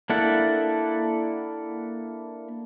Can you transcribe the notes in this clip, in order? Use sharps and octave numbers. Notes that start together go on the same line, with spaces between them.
A#3 D4 E4 A4 F#5